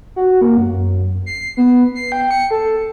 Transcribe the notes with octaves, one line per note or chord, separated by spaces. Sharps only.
F#4
A#3
F#2
C7
B3
C7
G5
C#7
A4